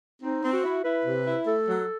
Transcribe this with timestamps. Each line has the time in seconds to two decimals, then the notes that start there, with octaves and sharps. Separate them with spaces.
0.22 C4 D#4
0.43 C4
0.53 F#4
0.64 E4
0.84 E4 B4
1.05 C3
1.25 E4
1.47 A3 A4
1.67 F#3